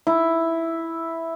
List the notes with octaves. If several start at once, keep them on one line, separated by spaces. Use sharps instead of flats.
E4